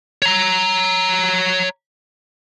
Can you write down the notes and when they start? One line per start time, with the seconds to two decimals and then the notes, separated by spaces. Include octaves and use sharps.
0.22 C#5 A#5